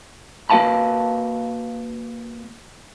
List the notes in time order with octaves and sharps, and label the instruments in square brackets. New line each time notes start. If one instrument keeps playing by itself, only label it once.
[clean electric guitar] A#3 F#4 B4 F5 A5 B5